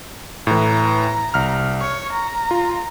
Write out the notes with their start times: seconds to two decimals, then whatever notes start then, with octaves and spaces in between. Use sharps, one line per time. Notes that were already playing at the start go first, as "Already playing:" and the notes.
0.47 A2 E3 A#5
1.34 C2 F6
1.81 C#5 C#6
2.12 A#5
2.51 F4